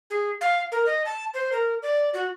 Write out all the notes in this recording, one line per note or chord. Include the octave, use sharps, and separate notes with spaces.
G#4
F5
A#4
D#5
A5
C5
A#4
D5
F#4